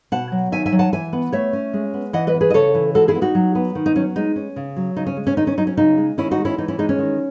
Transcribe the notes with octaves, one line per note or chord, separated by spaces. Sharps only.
B2 F#5 A5
F#3
D#3 E5 G#5
E5 G#5
F#3
F#5 A5
E3 E5 G#5
B3
A3 C#5 E5
C#4
G#3
B3
E3 D#5 F#5
B4 D#5
B3
G#4 B4
D#5
C#3 A4 C#5
E3
G#3 F#4 A4
E4 G#4
B3
D#4 F#4
F#3
B3
D#3
D#4
F#3 C#4
G#3 D#4
C#4
C#3
F#3
C#3 D#4
C#4
G#3
C#4
D#3 D#4
C#4
F#3 D#4
C#4
C#3 D#4
G#3
D#3 C#4 E4
D#4 F#4
G#3
C#4 E4
E3 D#4
C#4 E4
G#3 D#4
C#4
D#3